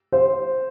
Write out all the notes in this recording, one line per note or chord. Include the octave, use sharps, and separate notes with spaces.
C5